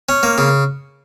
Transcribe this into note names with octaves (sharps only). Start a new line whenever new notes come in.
C#4
A#3
C#3